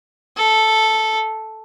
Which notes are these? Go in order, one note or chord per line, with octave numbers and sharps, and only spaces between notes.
A4